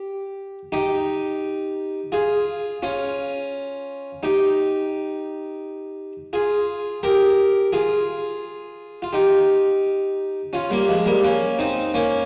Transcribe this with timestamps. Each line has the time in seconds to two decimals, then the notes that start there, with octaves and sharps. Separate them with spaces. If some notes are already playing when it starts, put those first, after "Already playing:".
Already playing: G4
0.72 D#4 G4
2.12 F4 G#4
2.83 C#4 F4
4.23 D#4 G4
6.33 F4 G#4
7.03 G4 A#4
7.73 F4 G#4
9.02 F4
9.13 D#4 G4
10.53 C#4 F4
10.70 G3 A#3
10.88 F3 G#3
11.05 G3 A#3
11.24 A#3 C#4
11.59 C4 D#4
11.94 A#3 C#4